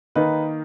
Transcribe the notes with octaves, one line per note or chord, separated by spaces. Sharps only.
D#3 A#3 D#4 B4